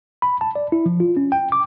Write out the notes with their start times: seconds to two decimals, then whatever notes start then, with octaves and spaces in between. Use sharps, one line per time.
0.22 B5
0.41 A5
0.56 D5
0.72 E4
0.86 F3
1.00 F4
1.17 C#4
1.32 G5
1.52 D6